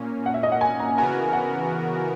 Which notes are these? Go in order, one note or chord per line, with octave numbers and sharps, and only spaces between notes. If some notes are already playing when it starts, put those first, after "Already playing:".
Already playing: A#2 A#3 C#4
F#5
E5
D#5
F#5
G#5
A#5
C#3 E3 B3 F#4 A#4 G#5
F#5